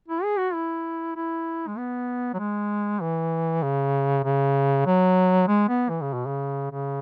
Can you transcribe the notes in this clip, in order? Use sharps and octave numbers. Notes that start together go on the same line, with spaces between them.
E4
G#4
F#4
E4
E4
G#3
B3
F#3
G#3
E3
C#3
C#3
F#3
G#3
B3
E3
C#3
B2
C#3
C#3